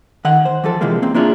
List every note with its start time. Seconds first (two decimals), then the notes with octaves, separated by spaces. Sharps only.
0.25 D#3 F#5
0.45 C5
0.64 E3 F3 A4
0.81 C3 E3 F3 G#3 A#3
1.02 A#3 C4
1.14 A#3 D4 E4 F4 G#4